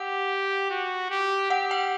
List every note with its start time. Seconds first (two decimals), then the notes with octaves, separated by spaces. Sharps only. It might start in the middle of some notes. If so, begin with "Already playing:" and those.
Already playing: G4 F#5
0.70 F#4
1.10 G4
1.50 G4 F#5
1.71 G5